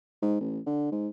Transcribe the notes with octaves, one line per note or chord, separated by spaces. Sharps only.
G#2
A1
D3
G#2